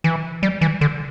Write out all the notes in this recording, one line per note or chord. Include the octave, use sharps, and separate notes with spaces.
E3
G3
E3
D3